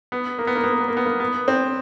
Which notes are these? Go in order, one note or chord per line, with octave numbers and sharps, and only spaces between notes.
B3
A#3
B3
A#3
B3
A#3
B3
A#3
B3
A#3
B3
C4